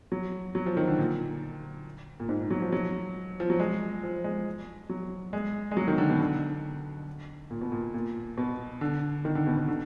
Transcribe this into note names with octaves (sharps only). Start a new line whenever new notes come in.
F#3
F#3
F3
D#3
D3
A#2
A#2
G#2
F#3
F3
F#3
F3
F#3
G#3
F3
G#3
F#3
G#3
G#3
F#3
D#3
D3
B2
D3
A#2
B2
A#2
A#2
B2
D3
D#3
D3
B2
B2
D3